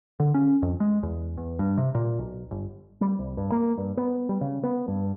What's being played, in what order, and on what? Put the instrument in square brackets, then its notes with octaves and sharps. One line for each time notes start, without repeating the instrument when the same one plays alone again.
[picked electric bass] D3
C#4
F2
G#3
E2
E2
G2
C3
A#2
B1
G1
G3
C2
G2
A#3
G2
B3
G3
C#3
B3
G2